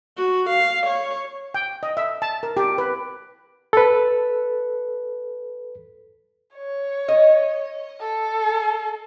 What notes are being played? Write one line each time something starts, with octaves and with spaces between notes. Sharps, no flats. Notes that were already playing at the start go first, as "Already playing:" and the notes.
F#4
F5
C#5
G5
D#5
E5
A5
A#4
G4
B4
A4 B4
C#5
D#5
A4